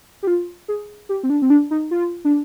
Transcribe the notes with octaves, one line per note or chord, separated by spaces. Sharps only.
G4
F4
G#4
G4
C4
D4
C4
D4
D#4
F4
D4